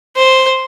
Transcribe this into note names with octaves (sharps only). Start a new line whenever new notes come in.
C5